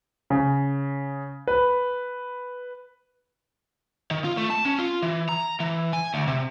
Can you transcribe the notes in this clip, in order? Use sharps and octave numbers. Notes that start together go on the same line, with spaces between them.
C#3
B4
D#3
F4
A3
A5
C#4
F4
E3
A#5
E3
G#5
D2
C3